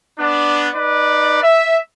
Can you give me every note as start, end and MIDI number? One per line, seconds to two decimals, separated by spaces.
0.19 0.68 59
0.19 0.68 62
0.74 1.39 63
0.74 1.39 71
0.74 1.39 74
1.42 1.79 76